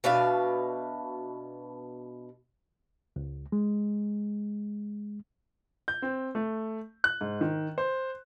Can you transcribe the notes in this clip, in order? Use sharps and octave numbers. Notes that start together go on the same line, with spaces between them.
B2 D4 E5 F5
C#2
G#3
G6
C4
A3
F#6
G#2
D#3
C5